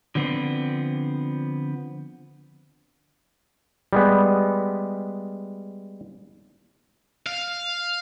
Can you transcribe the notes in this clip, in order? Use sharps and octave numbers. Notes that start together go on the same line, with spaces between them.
D3 F3 B3 C4
G3 G#3 B3
F5